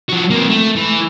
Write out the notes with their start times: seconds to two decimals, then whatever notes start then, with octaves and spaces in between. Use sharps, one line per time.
0.09 F3 F#4
0.30 A#3 C4
0.49 A3
0.76 E3